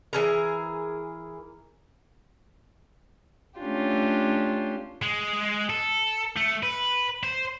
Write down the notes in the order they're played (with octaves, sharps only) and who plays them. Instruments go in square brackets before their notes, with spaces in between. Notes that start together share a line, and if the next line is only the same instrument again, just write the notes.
[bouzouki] E3 G#4 A#4
[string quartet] A3 C#4 D4 F4 G4
[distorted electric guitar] G#3
A4
A3
B4
C5